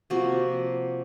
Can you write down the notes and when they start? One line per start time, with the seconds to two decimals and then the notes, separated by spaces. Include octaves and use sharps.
0.10 C3 F3 A#3 F#4